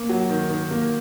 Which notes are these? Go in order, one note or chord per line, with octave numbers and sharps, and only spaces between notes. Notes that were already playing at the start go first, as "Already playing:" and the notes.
Already playing: A#3
F#3
D#3
D#3
A#3